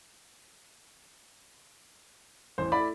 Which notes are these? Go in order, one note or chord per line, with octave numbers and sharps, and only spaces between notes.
A1 E2 C5
A3 E4 D5 B5